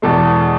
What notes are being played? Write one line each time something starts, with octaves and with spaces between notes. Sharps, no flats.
E2 B2 G#3 A4